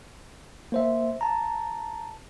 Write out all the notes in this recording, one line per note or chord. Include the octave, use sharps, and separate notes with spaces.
A#3 C5 E5
A5 A#5